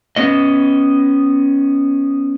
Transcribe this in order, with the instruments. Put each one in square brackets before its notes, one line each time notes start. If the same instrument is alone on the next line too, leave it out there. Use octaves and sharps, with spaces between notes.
[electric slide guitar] B3 C#4 D#5